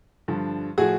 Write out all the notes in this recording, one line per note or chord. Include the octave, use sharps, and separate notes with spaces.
G2 D3 F3
A2 F3 F#4 G#4